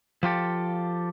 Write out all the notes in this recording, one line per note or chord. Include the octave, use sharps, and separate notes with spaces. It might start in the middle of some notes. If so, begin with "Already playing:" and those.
F3 F4 G4 A4